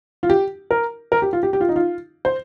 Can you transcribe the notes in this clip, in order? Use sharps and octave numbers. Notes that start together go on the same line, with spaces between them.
F4
G4
A#4
A#4
G4
F4
G4
G4
F4
D#4
F4
C5